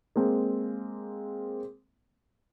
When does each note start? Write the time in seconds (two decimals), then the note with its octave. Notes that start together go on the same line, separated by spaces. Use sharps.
0.16 G#3 A#3 C4